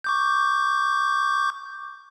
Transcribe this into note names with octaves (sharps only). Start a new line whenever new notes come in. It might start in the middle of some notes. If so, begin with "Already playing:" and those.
C#6 D6 G6